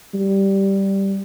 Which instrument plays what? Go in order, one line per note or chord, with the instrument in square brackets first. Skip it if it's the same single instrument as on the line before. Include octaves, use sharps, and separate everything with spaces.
[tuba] G3